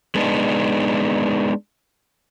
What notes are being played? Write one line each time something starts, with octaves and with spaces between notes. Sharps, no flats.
G#3 B3 D4 D#4